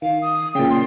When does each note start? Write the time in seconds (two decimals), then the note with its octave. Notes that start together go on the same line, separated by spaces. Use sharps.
0.02 D#3 F5
0.22 D#6
0.55 A#2 C#3 G5
0.70 C6